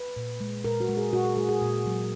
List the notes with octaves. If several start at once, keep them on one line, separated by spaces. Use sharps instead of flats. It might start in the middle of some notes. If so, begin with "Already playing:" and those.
Already playing: B4
A#2
G#3
A#2 A#4
F#4
G#3
G#4
A#2 F#4
G#4
G#3 G#4
G#4
A#2
F#3 A#3